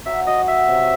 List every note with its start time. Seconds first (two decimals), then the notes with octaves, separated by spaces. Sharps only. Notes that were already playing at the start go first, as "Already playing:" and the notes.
0.06 F#3 E5
0.27 F#4 D#5
0.48 F#3 E5
0.68 C3